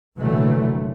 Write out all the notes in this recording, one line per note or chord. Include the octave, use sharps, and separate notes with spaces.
F1 A#2 D3 E3 F#3 A3